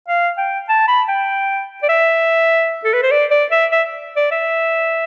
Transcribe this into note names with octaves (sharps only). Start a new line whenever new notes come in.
F5
G5
A5
B5
G5
D5
E5
A4
B4
C5
D5
D5
E5
E5
D5
E5